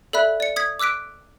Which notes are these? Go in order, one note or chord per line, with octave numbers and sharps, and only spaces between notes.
A4 D5 E5 B5 F#6
D5 C#7
D#6 G#6 B6
D6 E6 F#6 B6 D7